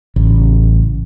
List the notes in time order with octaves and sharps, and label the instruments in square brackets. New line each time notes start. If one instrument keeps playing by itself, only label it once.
[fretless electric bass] A1 C#3